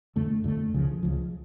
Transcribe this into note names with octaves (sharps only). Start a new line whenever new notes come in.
F2 D3 A3
F2 D3 A3
C#2 C#3 F3
C#2 C#3 F3